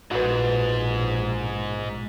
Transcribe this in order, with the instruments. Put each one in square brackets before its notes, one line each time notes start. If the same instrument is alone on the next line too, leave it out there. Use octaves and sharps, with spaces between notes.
[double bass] A#1 B2 [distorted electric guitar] G#2 [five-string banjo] F#4 B4